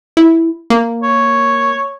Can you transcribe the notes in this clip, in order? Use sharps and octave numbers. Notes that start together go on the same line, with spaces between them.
E4
A#3
C#5